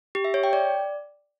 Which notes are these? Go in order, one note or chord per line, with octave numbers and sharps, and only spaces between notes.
G4
E5
C#5
G5
D5